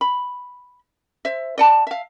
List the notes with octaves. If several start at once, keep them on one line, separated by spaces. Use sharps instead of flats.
B5
C5 E5
D5 F#5 A5
E5 F5